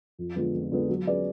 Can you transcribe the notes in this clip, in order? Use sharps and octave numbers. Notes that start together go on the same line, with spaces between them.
F2
D3 F3 G#3 B3
F2
D3 F3 G#3 B3
F#3
C#4 G#4 B4 D5